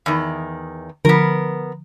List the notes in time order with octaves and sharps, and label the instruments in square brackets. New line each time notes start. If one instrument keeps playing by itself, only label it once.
[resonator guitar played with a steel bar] E2 D#3
[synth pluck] D3 F3 [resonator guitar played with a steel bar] B3 A#4